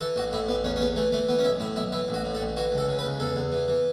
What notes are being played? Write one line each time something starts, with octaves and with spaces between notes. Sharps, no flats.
E3 A4
A1 F#4
A2 E4
A1 B3
E2 C#4
C#4
E2 B3
E3 A3
E3 A3
E3 B3
C#4
B1 E4
A2 E4
B1 E4
E3 E4
A1
F#4
A2
A4
A1
E3 F#4
C#2
A4
C#3
B4
C#2
E2 A4
E2
E3
E3